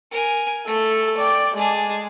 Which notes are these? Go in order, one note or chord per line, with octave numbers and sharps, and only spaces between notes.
A#4 G#5
A3 A4
D5 G5
G#3 G#4 A5